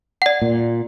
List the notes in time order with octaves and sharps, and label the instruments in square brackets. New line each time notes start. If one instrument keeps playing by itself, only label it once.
[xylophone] D5 F#5
[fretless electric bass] A#2